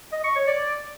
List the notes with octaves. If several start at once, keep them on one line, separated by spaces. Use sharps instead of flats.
D#5
C#6
C#5
D5